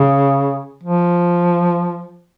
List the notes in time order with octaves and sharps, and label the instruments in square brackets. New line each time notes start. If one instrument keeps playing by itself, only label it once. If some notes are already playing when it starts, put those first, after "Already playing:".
Already playing: [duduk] C#3
F3